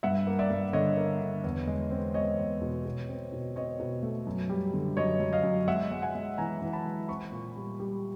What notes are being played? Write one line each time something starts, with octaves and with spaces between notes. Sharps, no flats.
G2 E5 F#5
A#3
D5 E5
G2
D3 C#5 D#5
A#3
D3
E2
G#3
C4
G#3 C#5 D#5
E2
B2
B2
C4
B2
C4 C#5 D#5
B2
A3
F#2
G3
D3
F#2 C#5 D#5
F#2
D#5 F5
F#2
G#3 E5 F#5
G#3
F#5 G#5
G#3
E3 G#5 A#5
E3
A5 B5
G#3
C4 B5 C#6
A#2
G3
G3